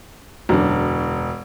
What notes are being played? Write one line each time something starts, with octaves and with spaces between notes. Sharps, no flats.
E1 F#2 D3 D4